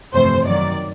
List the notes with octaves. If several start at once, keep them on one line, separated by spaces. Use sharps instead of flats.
G1 F2 C3 E3 A3 C5
F#2 D#3 F#3 D5